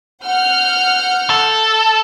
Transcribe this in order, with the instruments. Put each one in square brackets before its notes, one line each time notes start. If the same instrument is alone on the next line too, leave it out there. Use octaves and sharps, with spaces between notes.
[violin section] F#5 F6 G6
[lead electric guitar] A4